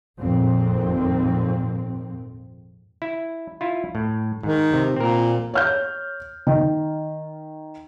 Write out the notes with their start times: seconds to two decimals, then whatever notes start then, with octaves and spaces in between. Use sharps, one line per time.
0.18 G#1 F2 A#2 D#3 C4
3.02 E4
3.61 E4 F4
3.95 A2
4.43 G#2 D#3
4.73 C3
4.96 A#2 C4 A#4
5.54 C#5 F6 G6
6.47 D#3